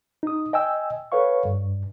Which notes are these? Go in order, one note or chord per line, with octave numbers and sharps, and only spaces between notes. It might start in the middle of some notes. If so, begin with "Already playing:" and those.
D#4 D#6
D#5 G5 G#5 E6
A4 B4 C#5 F5 C#6
G2